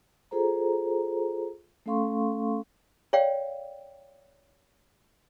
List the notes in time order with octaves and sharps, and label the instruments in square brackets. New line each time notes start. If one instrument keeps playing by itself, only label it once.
[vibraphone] F4 G#4 A4 C5 A#5
A3 C#4 A4 F5 C6 C#6
[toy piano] C#5 D5 F5 G5